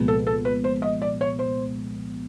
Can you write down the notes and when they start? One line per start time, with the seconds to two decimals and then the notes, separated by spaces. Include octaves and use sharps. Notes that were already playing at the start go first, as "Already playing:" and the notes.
Already playing: C2 A#2 F3 G#3 B3
0.08 A4
0.27 A4
0.45 B4
0.64 C5
0.82 D#5
1.02 D5
1.21 C#5
1.39 C5